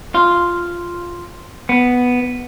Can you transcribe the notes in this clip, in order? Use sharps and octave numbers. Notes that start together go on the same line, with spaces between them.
F4
B3